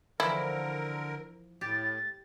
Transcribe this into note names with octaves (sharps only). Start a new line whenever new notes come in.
D3 E3 F3 E4 A#4
A2 G4 A6